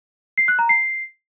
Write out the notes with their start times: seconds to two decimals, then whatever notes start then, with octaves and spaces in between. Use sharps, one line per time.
0.38 C7
0.48 F#6
0.59 A#5
0.69 C7